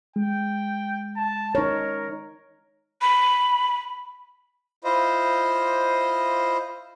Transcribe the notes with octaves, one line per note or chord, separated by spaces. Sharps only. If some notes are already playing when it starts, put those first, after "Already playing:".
G#3 G5
A5
D#4 A#4 C#5
B5
E4 F4 C5 D#5